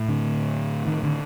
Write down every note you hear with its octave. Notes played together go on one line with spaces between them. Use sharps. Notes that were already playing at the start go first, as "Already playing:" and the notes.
Already playing: A2
D3
D#3
D3